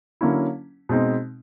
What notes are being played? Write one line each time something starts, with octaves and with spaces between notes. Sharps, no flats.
D3 F#3 A#3 C#4 E4
B2 G#3 C4 D#4